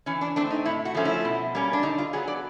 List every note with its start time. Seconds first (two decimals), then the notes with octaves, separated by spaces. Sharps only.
0.06 E3 C#4
0.21 D4
0.36 A3 C4 D4
0.50 D#4
0.66 A2 E4
0.85 F#4
0.95 F3 A3 C#4
1.05 E4
1.25 B2
1.55 G3 A#3 C#4
1.73 D4
1.83 D3 D#4
1.98 F4
2.13 F#3 B3 G#4
2.28 D5